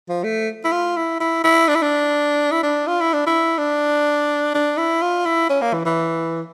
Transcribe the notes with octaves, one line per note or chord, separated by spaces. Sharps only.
F3
A3
E4
F4
E4
E4
E4
D4
E4
D4
E4
D4
F4
E4
D4
E4
D4
D4
E4
F4
E4
C#4
A#3
E3
E3